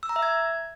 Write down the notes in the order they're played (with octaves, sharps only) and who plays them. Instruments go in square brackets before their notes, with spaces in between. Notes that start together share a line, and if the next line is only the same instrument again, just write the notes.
[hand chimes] E6
A#5
E5
G#6